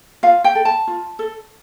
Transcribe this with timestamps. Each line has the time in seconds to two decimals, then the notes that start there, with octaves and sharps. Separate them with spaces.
0.23 F4 F5
0.44 G5
0.55 A4
0.65 A5
0.88 F4
1.19 A4